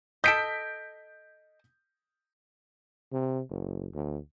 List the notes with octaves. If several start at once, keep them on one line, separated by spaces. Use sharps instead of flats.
A4 D#5 G6 B6 D7
C3
F#1
D2